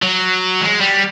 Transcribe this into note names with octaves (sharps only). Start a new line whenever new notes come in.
F#3
G#3
G3